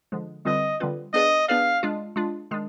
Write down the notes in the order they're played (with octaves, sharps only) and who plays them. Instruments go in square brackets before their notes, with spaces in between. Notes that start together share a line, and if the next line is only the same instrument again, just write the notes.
[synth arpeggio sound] D3 F3 G#3
[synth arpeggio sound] D3 G3 C4 F4 B4 [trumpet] D#5
[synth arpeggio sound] D3 G3 C4 F4 B4
[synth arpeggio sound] B3 D4 G#4 B4 D5 [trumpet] D#5
[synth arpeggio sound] B3 D4 G#4 B4 D5 [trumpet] F5
[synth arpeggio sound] G#3 D4 F4
G#3 D4 F4
D#3 G#3 D4